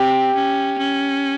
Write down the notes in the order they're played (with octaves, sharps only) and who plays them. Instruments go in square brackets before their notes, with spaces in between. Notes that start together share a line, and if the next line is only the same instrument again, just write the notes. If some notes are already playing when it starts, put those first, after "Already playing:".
Already playing: [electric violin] C4 [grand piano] G4
[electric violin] C#4
C#4